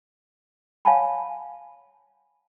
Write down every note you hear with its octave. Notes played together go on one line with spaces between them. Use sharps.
C#5 F5 F#5 G#5 A5 B5